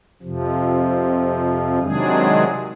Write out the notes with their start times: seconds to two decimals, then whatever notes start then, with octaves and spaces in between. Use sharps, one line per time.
0.23 F2 C3 F3
1.82 C3 D#3 F#3 G#3 D4 G#4